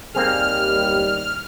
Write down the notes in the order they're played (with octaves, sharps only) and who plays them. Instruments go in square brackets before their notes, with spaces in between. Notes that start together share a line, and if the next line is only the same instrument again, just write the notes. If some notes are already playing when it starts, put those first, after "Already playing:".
[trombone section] D#2 G3 [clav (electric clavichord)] A#3 C4 G#4 [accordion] F6